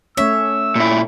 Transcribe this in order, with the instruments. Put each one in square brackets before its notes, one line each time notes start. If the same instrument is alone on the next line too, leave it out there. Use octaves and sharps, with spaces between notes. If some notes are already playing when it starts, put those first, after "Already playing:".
[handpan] A3 C#4 C#5 [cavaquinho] E5 [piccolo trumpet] E6
[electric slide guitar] A#2 E4